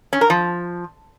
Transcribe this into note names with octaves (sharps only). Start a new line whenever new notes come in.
C#4
A#4
F3